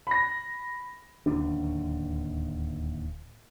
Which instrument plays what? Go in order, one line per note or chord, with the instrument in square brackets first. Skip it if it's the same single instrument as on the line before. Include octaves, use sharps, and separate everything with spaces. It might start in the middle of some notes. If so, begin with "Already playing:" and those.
[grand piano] B5 A#6
[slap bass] D1 D#2 C#3 D4